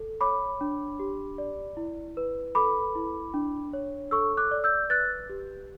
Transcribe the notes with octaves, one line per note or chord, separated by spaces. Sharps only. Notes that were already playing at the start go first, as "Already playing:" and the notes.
Already playing: A4
C#5 B5 D6
D4
G4
D5
E4
B4
A4 B5 D6
E4
D4
C#5
A4 C#6 E6
D6 F#6
D5
E6 G6
B4 F#6 A6
G4